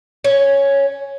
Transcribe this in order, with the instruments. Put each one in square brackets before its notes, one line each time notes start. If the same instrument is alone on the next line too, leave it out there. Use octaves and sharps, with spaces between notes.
[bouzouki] C#4